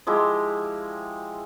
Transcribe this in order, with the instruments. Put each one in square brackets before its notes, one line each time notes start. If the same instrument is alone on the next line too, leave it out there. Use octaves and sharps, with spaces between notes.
[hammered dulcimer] F3 G#3 E4 G4